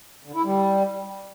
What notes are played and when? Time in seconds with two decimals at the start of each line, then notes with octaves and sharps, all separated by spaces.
0.25 D3
0.34 E4
0.44 G3